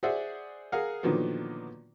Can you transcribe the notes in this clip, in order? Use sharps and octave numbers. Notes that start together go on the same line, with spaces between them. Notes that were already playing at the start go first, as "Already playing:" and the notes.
G#4 C5 D5 E5 F#5
G#4 A#4 F5 F#5
A#2 D3 D#3 F3 F#3 B3